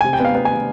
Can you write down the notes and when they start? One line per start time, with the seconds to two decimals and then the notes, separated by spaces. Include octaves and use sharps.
0.01 C3 G#5
0.13 G5
0.20 B3 F5
0.35 B3
0.45 G#5